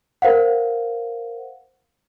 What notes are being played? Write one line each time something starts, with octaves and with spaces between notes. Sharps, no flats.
A#4 C5 F5 F#5